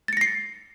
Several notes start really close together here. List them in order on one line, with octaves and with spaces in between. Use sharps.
A6 C#7 A#6 C7